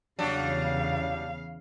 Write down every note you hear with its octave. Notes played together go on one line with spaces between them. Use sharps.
E2 C#3 F#3 G3 D4 F5